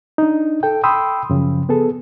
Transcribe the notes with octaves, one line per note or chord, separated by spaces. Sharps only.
D4 D#4
A4 G5
G5 B5 C6 D#6 E6
F#2 C#3 F3
B3 G#4 A4